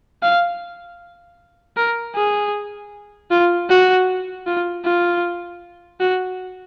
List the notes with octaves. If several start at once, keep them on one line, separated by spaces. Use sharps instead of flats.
F5
A#4
G#4
F4
F#4
F4
F4
F#4